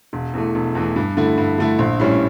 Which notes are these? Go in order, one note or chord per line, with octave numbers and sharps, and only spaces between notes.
E1
E2 E3 A3
E1
E2 E3 A3
G2
D3 A3 E4
G2
D3 A3 E4
A#1
A2 G3 C#4